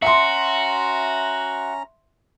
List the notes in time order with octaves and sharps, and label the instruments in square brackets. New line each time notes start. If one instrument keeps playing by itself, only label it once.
[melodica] C#4 A#5 [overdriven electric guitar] F#4 [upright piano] E5 C6